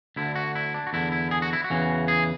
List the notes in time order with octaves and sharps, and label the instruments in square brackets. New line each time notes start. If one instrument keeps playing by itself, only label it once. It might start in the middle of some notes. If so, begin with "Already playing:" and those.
[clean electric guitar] D2 D3 E4
F#4
E4
D4
F#4
E2 D3 E4
E4
G#4
F#4
E4
F#4
E2 C#3 E3
G#4